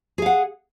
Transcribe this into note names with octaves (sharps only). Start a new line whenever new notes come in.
G#4 F5 F#5